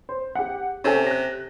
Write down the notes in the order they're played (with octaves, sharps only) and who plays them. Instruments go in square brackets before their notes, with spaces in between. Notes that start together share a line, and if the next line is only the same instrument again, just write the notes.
[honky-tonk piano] C5
G4 F#5
[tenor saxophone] C3 [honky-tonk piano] C#4 A4 G#5
[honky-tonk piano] F#6 A#6